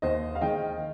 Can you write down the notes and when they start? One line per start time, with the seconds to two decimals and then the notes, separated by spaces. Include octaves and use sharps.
0.02 D#2 C5 D#5
0.35 F5
0.41 D#3 G#3 D#5 G5